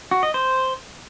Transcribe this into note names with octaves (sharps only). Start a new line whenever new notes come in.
F#4
D#5
C5